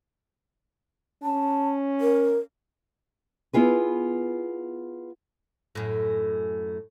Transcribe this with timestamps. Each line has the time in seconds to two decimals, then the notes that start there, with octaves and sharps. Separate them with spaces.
1.23 C#4 A5
2.01 A#4
3.53 B3 E4 F4 G#4 B4
5.75 F#2 A2